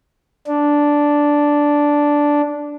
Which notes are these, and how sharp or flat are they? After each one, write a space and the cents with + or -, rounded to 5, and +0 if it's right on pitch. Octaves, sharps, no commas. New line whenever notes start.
D4 -5